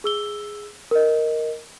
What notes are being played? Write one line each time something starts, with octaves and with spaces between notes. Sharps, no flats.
G#4 E6 G7
A#4 D#5